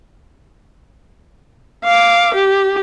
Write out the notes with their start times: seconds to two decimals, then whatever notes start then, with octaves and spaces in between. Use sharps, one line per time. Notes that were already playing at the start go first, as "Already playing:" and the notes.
1.84 F5 D6
2.35 G4